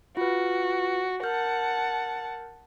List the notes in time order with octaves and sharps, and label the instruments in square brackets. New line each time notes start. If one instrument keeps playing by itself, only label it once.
[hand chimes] F4 B4 [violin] F#4
[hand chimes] A#4 F6 G6 [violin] F#5 A5